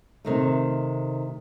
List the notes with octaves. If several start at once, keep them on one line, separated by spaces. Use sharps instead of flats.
C3 D#3 A3